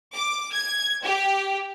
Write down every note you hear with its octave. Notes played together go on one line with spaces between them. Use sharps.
D6
G#6
G4